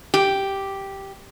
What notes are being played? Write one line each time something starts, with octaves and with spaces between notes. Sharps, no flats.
G4